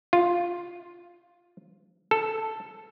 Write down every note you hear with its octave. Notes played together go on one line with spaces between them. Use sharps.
F4
A4